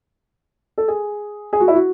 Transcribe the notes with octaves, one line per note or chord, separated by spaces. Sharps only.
A4
G#4
G#4
F#4
E4
F#4